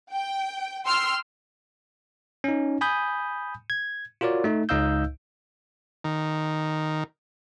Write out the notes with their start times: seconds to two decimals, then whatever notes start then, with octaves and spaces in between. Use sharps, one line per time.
0.13 G5
0.85 G5 C6 E6 F6
2.44 C#4 D#4
2.81 G#5 B5 D#6 G6
3.70 G#6
4.21 F4 F#4 A#4 C#5 D5
4.44 A3 D#4
4.69 C#2 D#4 D#5 F5 E6 G6
6.04 D#3